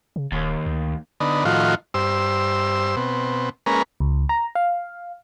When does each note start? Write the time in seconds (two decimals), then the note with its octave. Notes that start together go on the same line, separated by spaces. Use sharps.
0.16 C#3
0.32 D#1 D#2
0.66 D2
1.20 D3 B3 D#4
1.45 A2 D#3 F3 F4 F#4
1.94 G2 C5 E6
2.97 B2 C4
3.66 G#3 A#3 C#4 A#4 B4
4.00 C#2
4.29 A#5
4.55 F5